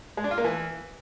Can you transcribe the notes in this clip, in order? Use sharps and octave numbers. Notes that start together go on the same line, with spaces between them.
G#3
D4
F4
A#3
E3